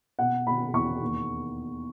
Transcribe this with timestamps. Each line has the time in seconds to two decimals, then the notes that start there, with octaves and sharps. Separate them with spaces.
0.19 B2 F#5
0.47 B2 B5
0.73 E2 C#6
1.02 D#2